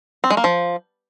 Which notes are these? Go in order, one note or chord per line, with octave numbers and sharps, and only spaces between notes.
C4
G#3
A#3
F3